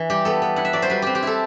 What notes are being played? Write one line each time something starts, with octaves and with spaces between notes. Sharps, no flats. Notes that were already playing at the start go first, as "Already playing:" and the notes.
Already playing: E3
G3 G4
B3 A4
B3
E4 F#5
E5
F#3 D5
C5
G3 B4
C4 G4
G4
E4 A4